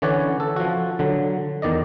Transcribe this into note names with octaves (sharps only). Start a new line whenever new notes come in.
D3 E3 C#4 C#5 D5 F#5
A4
F3 F#4
D3 F#3
E2 D#3 D5 D#5